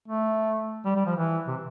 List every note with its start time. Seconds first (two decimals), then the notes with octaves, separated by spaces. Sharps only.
0.08 A3
0.85 G3
0.96 G3
1.06 F3
1.16 E3
1.47 C3